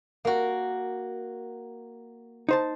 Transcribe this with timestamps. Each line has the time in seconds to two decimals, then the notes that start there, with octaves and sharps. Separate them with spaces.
0.25 A#3 F#4
2.49 D#4 C5 A5